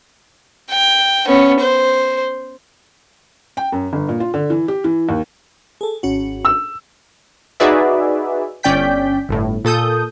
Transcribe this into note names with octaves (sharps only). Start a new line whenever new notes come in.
G5
B3 C#4
C5
G5
F#2
G1
A#2
F4
D3
E3
G4
E3
D#2
G#4 A4
G#1 C#4 F#4
E6
D#4 F#4 G#4 B4 D5 E5
G1 C#4 D5 G5 G6 B6
G1 A2
A#2 A4 D#6 G6